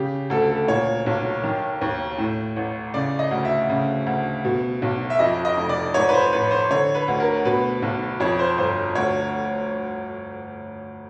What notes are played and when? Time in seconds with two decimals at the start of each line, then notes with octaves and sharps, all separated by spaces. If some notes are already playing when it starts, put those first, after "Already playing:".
Already playing: C#3 G4
0.30 D2 A4
0.49 A4
0.68 A#2 C#5
1.06 B1
1.44 D#3
1.81 D#2
2.18 A2
2.56 A1
2.94 C#3 D5
3.19 D#5
3.31 D2
3.45 E5
3.69 C#3
4.07 D2
4.44 B2
4.82 B1
5.10 E5
5.19 F2 D#5
5.45 D#5
5.57 F1
5.69 D5
5.94 G#2 C#5
6.09 B4
6.14 C5
6.32 A1 B4
6.51 C5
6.71 D3 C#5
6.95 B4
7.08 D2
7.20 A#4
7.45 B2 B4
7.82 B1
8.20 F2 C#5
8.39 C5
8.58 G1 C5
8.95 D2 C#5